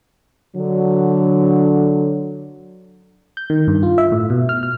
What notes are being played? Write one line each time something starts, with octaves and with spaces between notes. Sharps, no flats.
D3 F#3
G6
D#3
G2
F4
E5
A2
B2
F6
F6